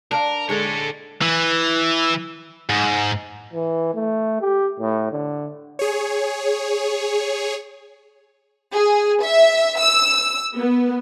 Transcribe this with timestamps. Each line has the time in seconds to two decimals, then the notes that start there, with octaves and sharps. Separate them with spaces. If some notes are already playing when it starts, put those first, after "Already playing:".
0.11 D4 A#4 F5
0.49 D3 G#3 A4 C#5
1.22 E3
2.70 G#2
3.53 E3
3.94 A3
4.41 G4
4.80 A2
5.12 D3
5.79 G#4 C#5
8.75 G#4
9.24 E5
9.80 E6
10.57 B3